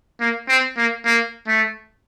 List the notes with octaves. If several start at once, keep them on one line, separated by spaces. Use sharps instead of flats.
A#3
C4
A#3
A#3
A3